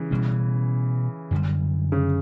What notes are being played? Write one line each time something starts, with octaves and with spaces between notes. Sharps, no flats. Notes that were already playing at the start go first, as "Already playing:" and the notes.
Already playing: C#3 E3
B2 G3 C#4
F#2 D3 G3
C#3